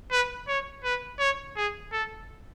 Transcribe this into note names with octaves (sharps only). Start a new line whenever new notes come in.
B4
C#5
B4
C#5
G#4
A4